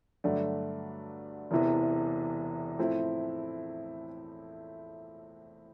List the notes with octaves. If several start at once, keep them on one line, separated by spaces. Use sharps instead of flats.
G2 D3 F#3 A3 D4
E1 E2 C3 E3
A2 F3 A3 C4 E4